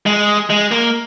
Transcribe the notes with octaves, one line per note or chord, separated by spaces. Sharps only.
G#3
G#3
A#3